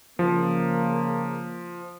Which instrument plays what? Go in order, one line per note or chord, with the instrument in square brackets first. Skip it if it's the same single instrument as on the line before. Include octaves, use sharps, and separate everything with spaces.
[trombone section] C#3 A#3 [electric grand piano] F3